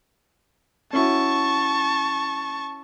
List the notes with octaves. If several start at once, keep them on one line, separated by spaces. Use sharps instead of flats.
C#4 E4 F#4 A5 C#6